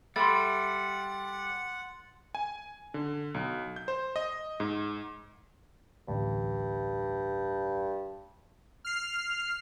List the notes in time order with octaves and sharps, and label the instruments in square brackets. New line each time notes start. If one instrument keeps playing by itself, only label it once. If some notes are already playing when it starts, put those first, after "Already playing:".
[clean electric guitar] G3 [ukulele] A4 E5 B5 [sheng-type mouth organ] F#5 [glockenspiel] C6 A6
[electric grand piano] G#5
D3
B1
G6
C5
D#5
G#2
[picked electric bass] A1 D2 [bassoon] G2
[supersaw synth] F6 C7